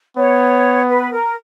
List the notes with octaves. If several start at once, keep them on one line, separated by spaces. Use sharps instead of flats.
B3 C#5
B4
A#4